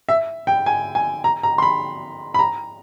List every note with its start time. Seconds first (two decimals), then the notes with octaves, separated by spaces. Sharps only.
0.09 E5
0.47 G5
0.66 G#5
0.95 G#5
1.24 A#5
1.43 A#5
1.58 C6
1.62 B5
2.34 B5
2.39 A#5